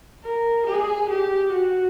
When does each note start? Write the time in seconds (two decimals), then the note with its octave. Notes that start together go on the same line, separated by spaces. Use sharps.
0.25 A#4
0.67 G#4
1.10 G4
1.52 F#4